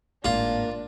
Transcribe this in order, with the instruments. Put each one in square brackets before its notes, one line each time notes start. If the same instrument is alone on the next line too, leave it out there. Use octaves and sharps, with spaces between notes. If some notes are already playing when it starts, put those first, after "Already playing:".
[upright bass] G#1 A2 [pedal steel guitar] A#3 [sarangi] D4 [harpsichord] F4